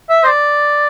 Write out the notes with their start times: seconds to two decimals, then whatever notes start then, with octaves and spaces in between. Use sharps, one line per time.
0.09 E5
0.24 C5
0.27 D5